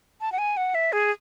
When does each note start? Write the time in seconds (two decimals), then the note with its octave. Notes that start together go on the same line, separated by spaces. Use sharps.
0.21 A5
0.32 F#5
0.38 G#5
0.57 F#5
0.75 E5
0.93 G#4